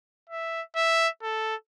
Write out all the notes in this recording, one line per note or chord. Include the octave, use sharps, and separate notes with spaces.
E5
E5
A4